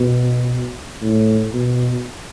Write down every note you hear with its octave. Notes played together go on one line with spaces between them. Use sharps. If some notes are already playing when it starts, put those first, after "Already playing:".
Already playing: B2
A2
B2